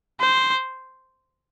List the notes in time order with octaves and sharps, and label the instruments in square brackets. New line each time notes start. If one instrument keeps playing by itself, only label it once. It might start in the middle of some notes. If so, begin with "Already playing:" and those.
[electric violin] C5